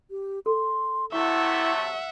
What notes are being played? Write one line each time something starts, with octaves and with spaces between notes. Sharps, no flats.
G4
A4 C6
C3 F#3 A3 E4 E5 F#5 C#6